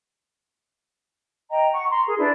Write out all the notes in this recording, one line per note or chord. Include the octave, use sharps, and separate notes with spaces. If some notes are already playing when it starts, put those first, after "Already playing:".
D#5 G5 A#5
F#5 C#6
A#5 C6
G#4 A#4
D4 E4 B4 D5